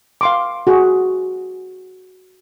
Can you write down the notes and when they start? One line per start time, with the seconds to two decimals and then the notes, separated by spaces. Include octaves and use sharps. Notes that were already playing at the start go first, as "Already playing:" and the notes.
0.21 F5 C6 D6
0.67 F#4 G#4